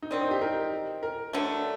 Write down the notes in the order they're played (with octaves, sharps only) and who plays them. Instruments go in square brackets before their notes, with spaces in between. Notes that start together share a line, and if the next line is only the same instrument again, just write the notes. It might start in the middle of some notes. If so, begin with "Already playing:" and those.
[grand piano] D#4
[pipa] D#3 F#3 C4 [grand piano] D4
[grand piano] D#4
G4
A#4
A#4
[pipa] D3 F#3 A3